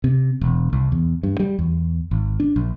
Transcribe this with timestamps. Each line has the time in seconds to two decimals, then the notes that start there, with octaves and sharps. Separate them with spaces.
0.04 C3
0.41 E1
0.73 C2
0.92 E2
1.23 G2
1.40 G3
1.59 E2
2.11 G#1
2.40 D4
2.56 A#1